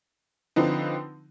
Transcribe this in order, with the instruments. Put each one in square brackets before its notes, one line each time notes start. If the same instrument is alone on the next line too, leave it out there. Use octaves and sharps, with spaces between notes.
[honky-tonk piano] D3 F3 C4 D#4 B4